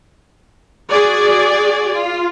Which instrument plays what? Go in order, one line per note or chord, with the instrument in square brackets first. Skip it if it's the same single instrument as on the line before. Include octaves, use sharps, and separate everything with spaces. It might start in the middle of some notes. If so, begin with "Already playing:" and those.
[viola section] F#4 G#4 D5
F4